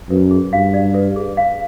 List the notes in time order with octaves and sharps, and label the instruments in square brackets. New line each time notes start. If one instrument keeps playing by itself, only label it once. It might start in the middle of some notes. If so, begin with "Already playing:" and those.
[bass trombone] F#2 [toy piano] B4
[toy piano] G#4
[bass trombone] G2 [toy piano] F5
[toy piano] D5
B4
G#4
F5